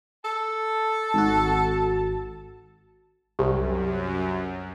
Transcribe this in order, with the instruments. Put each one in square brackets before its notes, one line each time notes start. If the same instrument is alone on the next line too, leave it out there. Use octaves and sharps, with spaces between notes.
[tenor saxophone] A4 [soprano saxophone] A5
[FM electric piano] G#1 F#4
[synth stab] C2 [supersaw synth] F#2 [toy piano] G4